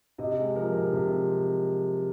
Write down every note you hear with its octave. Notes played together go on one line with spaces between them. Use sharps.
C3 D#5
G#3
F3 A#4
C3
C3